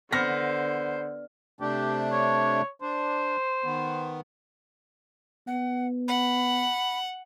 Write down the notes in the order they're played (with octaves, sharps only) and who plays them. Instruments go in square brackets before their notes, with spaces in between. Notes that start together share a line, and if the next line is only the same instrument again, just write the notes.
[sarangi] D3 [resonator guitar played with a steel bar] B3 [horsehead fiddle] C5 [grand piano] F6 A#6
[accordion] C3 A3 D4 [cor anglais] G4
[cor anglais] C#5
[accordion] D4 [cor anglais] C5
[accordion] D#3 B3
[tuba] B3 [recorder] F#5
[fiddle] F#5 [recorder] B5